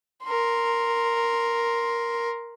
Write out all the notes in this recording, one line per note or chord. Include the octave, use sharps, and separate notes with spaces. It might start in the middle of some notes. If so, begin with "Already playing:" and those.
A#4 C6